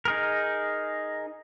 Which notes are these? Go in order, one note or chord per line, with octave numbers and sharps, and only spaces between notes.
D#4 G#4 A#4